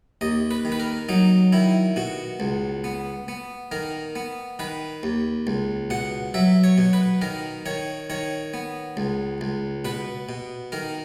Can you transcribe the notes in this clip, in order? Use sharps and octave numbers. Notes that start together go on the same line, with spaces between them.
D#2 D#5
B4
D#3
B4
A#4
F#3 D#4
D#3 E4
B2 F#4
C#2
B3
B3
D#3 A#4
B3
D#3 B4
D#2
C#2
B2 F#5
F#3 E5
C#5
B2
B4
D#3 A#4
D#3 C#5
D#3 C#5
B3
C#2
C#2
B2 B4
B2
D#3 A#4